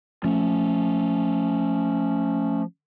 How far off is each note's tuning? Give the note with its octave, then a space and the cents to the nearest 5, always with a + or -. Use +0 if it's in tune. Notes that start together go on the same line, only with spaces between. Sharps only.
F3 +0 A3 +0 C#4 +0